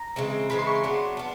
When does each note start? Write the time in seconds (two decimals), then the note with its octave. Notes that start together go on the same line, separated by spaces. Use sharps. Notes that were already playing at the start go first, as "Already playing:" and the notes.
Already playing: A#5
0.16 C#3 E3 G#3 C4
0.50 C#3 E3 G#3 C4 B5
0.59 C6
0.67 C#6
0.75 C6
0.84 F#3 B3 D4
1.17 B3 D4